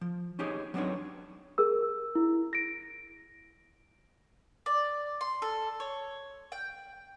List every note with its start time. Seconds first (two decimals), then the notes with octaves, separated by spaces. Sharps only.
0.01 F3
0.39 C#4 D#4 G4 G#4 C#5 D#5
0.74 F#3 B3 C4 D4 D#4 C#5
1.58 G#4 A#4 E6
2.15 E4
2.53 A#6 D7
4.66 D5
5.21 C6
5.42 A4
5.80 C#5
6.52 G5